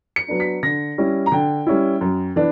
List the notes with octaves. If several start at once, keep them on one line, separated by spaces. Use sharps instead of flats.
C#7
F#3 B3 D4
B6
D3 A#6
G3 C#4 E4
A#5
D3 G5
G3 C#4 E4
F#2
E3 B3 D4